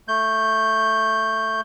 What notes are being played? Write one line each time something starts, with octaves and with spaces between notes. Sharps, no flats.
A3 G6